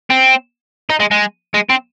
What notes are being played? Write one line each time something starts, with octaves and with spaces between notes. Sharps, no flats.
C4
D#4
G#3
G#3
G#3
C4